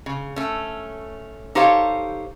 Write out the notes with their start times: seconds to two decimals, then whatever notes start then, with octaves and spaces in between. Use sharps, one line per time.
0.06 C#3
0.36 A3 C#4
1.55 D#4 G4 A4 C5 C#5 F5